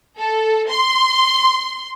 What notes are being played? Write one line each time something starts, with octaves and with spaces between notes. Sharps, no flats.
A4
C6